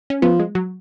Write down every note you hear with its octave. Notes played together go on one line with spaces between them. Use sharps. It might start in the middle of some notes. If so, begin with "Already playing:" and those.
C#4
F3 B3
G#3
F#3